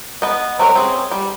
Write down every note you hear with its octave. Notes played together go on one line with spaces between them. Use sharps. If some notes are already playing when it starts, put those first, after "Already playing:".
B3 D#5
F#3 C4 F#4 A#4
C4 C#4 G#4
G3